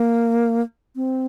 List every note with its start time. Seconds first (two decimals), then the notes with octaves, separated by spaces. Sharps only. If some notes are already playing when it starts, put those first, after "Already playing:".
Already playing: A#3
0.96 C4